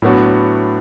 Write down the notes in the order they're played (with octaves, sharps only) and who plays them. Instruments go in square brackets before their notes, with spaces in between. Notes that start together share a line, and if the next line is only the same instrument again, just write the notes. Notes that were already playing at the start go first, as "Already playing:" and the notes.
[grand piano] A2 F#3 B3 D4 F#4